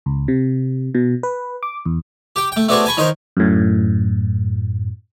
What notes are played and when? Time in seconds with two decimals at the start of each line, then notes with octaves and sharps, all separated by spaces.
0.06 C#2
0.28 C3
0.95 B2
1.23 B4
1.63 D6
1.85 E2
2.36 G4 G5
2.52 A3 G5
2.68 A3 B3 D4 F#4 G#4 C5
2.86 G#5 A5 B5 C#6
2.97 D#3 C#4 D#4 A#4 C5 C6
3.37 F#2 A2